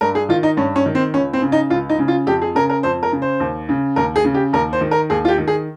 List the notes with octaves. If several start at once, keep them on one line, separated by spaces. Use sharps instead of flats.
G2 A#4
G#4
D#3 F4
D#4
G2 C#4
C#4
D#3
C4
C#2 C#4
C4
C#3
D#4
C#2 F4
D#4
C#3
F4
F2 G4
G#4
C#3 A#4
A#4
F2 C5
A#4
C#3
C5
D#2
C#3
D#2 A#4
G#4
C#3
G4
D#2 A#4
C5
D#3
A#4
D#2 G#4
F4
G4
D#3
G#4